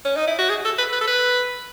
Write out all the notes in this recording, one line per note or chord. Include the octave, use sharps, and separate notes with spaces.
C#4
D#4
E4
F#4
G#4
A4
B4
B4
A4
B4